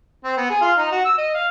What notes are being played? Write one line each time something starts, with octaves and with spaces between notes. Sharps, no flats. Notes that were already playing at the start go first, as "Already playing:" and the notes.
C4
B3
G#4
F4
D#4
F#4
E6
D#5
F5